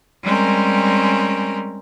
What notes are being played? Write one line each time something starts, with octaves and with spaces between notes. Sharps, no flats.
G3 G#3 C4 C#4 A#4